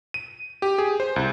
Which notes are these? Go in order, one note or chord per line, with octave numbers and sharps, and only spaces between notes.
D#7
G4
G#4
C5
C2